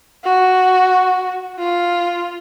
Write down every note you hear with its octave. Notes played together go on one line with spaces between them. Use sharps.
F#4
F4